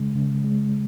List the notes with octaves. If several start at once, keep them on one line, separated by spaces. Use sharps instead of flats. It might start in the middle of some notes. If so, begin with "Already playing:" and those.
Already playing: C#3 G#3
C#3
G#3